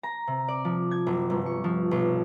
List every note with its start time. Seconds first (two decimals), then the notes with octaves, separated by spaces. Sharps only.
0.03 A#5
0.27 C3
0.48 D5
0.65 F3
0.91 G#6
1.07 F#1
1.30 G1
1.46 C#6
1.64 F3
1.91 B1